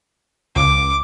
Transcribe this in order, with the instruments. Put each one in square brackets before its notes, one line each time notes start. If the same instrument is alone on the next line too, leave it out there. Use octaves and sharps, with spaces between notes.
[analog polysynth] C#2 [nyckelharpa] D6